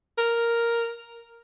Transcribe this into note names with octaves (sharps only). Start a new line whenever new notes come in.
A#4